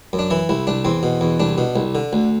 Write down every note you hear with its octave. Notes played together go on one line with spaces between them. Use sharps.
F#2
D4
E3 E4
C2 E4
C2 D4
E2 C4
B2
E2
C2 D4
B2
C2
D3
D2